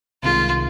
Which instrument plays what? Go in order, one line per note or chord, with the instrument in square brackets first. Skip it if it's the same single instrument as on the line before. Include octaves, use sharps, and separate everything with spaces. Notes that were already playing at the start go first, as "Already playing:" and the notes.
[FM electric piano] C2 C3 D#3 G#3 [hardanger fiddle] F4